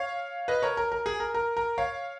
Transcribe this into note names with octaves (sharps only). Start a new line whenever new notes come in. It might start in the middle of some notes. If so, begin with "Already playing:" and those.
Already playing: C#5 F5
B4 D#5
A#4 C#5
A#4
A#4
G#4
A#4
A#4
A#4
C#5 F5